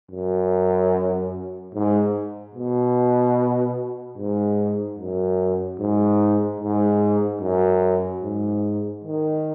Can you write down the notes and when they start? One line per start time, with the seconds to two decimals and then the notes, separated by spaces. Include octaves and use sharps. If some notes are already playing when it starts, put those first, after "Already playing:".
0.11 F#2
1.74 G#2
2.54 B2
4.17 G#2
4.98 F#2
5.79 G#2
6.60 G#2
7.41 F#2
8.22 G#2
9.04 D#3